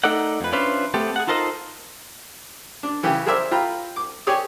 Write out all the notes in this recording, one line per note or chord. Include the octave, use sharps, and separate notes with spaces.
A3 D#4 A4 A#4 D5 F#5
F2 B4
C#4 D4 E4 F4 B4 C5
A3 B3 C4 G4 A4
G#4 F#5
D#4 F4 A4 A#4 C5 D#5
D4
C#3 E3 G4
G#4 A#4 C5 D5 E5
F4 G5 A#5 B5
D6
G4 G#4 C#5 D5 D#6